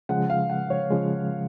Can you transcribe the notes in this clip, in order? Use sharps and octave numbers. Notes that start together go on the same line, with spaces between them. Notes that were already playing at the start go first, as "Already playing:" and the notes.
C#3 F3 G#3 F#5
F5
F#5
C#5
C#3 F3 G#3